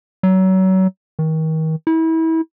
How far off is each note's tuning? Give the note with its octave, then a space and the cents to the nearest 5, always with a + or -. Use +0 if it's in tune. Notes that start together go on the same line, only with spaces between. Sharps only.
F#3 +30
D#3 +35
E4 -30